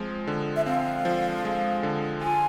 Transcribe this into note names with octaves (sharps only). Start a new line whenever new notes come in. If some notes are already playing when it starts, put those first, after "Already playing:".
Already playing: F3 G#3 C4
D3
E5
C4 F5
F3
G#3
D3
F4 G#5